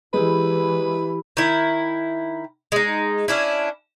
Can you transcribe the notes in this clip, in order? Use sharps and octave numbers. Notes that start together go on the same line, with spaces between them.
E3 G#3 E4 G4 B4 B5
D#3 E4
G#3 D#4
C#4 D4 E4